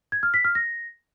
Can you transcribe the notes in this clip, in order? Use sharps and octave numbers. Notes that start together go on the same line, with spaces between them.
G#6
F6
B6
F6
A#6